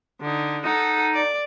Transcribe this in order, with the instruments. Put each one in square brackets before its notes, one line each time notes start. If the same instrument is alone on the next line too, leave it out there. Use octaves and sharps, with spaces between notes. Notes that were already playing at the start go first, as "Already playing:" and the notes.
[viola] D3 D#4
[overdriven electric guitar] D#4 [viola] A4 F#5
[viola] D5